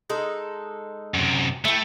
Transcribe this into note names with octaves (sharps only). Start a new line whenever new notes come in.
G#3 D#4 A4
F#2 C3
A3 E4 G5